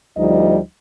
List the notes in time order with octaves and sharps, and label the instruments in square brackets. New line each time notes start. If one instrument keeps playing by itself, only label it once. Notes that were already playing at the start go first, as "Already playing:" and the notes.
[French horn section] D2 F3 G3 D#4 D#5